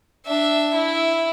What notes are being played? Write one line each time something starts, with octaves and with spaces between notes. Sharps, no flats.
D4 E5
E4